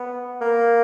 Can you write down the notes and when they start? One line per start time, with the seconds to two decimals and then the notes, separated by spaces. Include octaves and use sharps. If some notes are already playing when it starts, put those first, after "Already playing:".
Already playing: B3
0.41 A#3